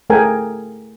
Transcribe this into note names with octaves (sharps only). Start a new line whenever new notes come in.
A3 G#4 A#4 G5 G#5